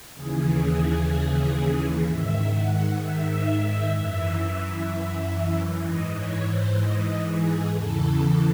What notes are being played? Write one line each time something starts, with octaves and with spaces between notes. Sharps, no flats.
D#2 C#3 E3 G#4
G#2 D#3 E5
F#5
E5
F#2 E3
G#2 E3 D#5
C#5
C5
D#5
G#4
E2 C#3 E3 A4